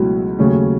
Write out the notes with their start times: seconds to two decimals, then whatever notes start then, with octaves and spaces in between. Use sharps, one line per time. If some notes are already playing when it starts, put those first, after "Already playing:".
Already playing: C#2 B2 F#3 A3 E4
0.39 D#2 C#3 F#3 A3 C#4